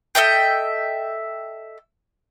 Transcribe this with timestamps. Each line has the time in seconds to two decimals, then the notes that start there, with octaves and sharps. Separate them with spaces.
0.15 A4 D#5 E5 G5